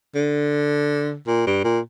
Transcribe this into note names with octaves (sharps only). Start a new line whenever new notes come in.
D3
A#2
G2
A#2